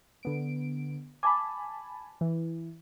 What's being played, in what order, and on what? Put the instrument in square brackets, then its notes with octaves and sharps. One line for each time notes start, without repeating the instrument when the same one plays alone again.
[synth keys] D3 B3 D7
[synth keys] G#5 A5 B5 [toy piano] D6
[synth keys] E3